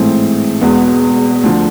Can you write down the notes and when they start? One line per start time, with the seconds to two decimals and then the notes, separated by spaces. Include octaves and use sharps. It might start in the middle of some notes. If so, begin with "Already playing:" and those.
Already playing: A1 G#2 E3 A3 C4
0.61 E1 E2 B2 G#3 B3
1.44 D2 D3 F3